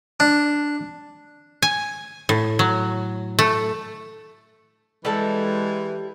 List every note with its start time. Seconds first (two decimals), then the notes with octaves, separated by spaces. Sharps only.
0.20 D4
1.62 G#5
2.29 A2
2.59 F#3
3.39 A3
5.05 E3 G3 G#3 A4 A5